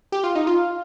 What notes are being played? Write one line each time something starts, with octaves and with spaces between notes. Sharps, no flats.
G4
F4
D#4
F4